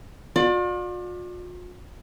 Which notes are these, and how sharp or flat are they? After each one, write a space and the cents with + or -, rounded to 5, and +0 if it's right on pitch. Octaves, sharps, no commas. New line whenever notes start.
F4 +45 D5 +25